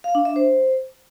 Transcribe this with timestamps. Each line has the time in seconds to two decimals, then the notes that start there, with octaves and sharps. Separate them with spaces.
0.04 F5
0.15 D4
0.25 E5
0.36 C5